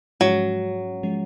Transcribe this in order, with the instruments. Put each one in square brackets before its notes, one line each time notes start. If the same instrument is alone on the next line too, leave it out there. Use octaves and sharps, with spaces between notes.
[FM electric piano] G#2 F3 G#3 C#4 [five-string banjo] F#3
[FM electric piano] F3 G#3 C#4